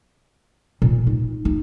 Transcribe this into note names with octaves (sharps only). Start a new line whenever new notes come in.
A#2
D#4
D#4